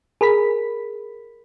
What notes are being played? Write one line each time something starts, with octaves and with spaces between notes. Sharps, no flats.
G#4 A#4 B5 B6